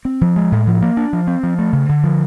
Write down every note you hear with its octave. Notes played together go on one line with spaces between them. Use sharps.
C4
F3
G#3
A2
F3
A#3
D4
F3
C4
F3
A3
C#3
D3
F3